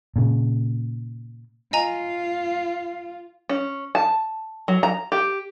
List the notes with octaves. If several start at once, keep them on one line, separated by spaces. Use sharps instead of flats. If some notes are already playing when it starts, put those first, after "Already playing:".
A#2 C#3
F4 D#5 G#5 A#5
C#4
A5
F#3
A#5
G4